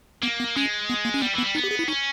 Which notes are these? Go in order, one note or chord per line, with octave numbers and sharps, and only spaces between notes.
A#3 B3
B3
G#3 C#4
B3
A#3
C#4
G3 B3
E3
B3
G3
B3 D#4
G4
G#4
E4
C#4 D#4